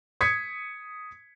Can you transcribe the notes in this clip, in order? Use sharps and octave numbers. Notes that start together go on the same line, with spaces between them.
D#6 G#6 B6 C#7